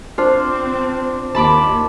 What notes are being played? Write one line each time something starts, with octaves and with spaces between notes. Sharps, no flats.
C4 D4 F4 C5
D#2 A5 B5 D6